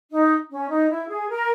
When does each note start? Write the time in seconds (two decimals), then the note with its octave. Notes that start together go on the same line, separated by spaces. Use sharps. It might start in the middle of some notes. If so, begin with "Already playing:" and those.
0.12 D#4
0.51 C#4
0.70 D#4
0.89 E4
1.09 G#4
1.29 A#4